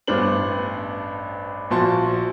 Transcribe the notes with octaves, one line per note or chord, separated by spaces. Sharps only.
A1 G2 B3 D4 C5 F#7
A#1 F3 F#4 A5 C6